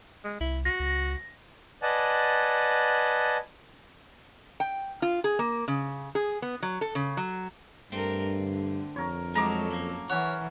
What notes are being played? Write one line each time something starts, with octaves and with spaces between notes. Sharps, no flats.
G#3
C2 E4
F#4 A#6
C#2
B4 D5 D#5 F#5 G#5 A5
G5
F4
G#4
A#3
C#3
G#4
B3
F#3
A4
C#3
F#3
G2 A3 C4 D4 A#4
D3
F2 A#4 C#5
F#3 G#3 A3 A4 C#5 A#5 D6
F#2 A#3
E3 C#4 C#5 F#5